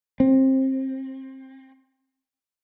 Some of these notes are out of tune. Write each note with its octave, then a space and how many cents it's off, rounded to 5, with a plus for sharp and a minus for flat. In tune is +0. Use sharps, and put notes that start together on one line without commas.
C4 +25